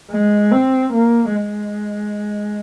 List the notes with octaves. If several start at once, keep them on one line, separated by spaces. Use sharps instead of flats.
G#3
C4
A#3
G#3